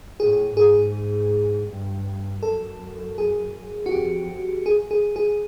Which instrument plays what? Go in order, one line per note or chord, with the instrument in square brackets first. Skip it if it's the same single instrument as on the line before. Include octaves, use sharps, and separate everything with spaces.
[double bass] A2 [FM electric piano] G#4
[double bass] G#2 [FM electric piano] G#4
[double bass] G2
[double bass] F#2 [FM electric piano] A4
[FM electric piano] G#4
F#4
[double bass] F2 [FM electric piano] G4
[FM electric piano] G#4
G#4
G#4